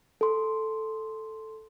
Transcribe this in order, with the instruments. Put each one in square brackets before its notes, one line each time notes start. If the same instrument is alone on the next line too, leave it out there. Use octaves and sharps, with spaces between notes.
[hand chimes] A4 C6